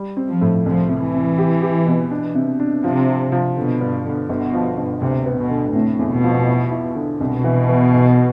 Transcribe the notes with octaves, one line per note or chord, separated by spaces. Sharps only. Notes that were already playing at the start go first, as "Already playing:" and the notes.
Already playing: G3
C4
F3
A2
C2 F3
C3
E3
C3
G4
G4
B2
D4
C3
D4
C3 F3
F3
F3
B2 D3
G2
D3
G1 B2
F3
G1
D2 C3
B3
B2
D3
A2 C3
E2
B2
F3
E4
E4
D3
C2 B2
E3
E3
B1